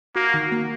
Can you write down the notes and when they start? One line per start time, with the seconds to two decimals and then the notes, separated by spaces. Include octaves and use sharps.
0.16 A#3 F#4
0.34 D#3
0.52 A#3